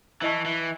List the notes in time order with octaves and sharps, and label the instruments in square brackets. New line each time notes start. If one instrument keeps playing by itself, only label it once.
[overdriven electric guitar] E3 [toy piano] E4 B4 D#5 A5 C#6
[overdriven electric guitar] E3